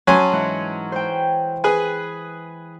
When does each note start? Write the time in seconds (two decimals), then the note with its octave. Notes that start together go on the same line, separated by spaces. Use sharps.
0.07 F#3 C#4 G#5 A5 C6
0.32 G#2 E3 F#5
0.92 C5 G5
1.64 G#4 B4 G#5